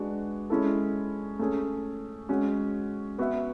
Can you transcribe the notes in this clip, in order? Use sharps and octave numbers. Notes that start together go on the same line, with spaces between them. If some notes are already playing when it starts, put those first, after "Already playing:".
Already playing: G#3 D4 F#4 B4
G#3 C#4 E4 A4
A3 C#4 G#4
G#3 C#4 F#4
B3 F#4 B4 E5